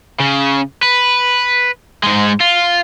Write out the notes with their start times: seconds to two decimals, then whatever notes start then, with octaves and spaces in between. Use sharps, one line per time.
0.20 C#3
0.83 B4
2.03 G#2 G#3
2.41 F4